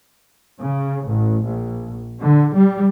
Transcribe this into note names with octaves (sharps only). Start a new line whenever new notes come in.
C#3
A1
A#1
D3
G3